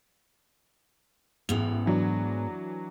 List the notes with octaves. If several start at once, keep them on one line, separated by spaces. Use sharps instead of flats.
A1 G#2 B3 F7
E3 F#3 D4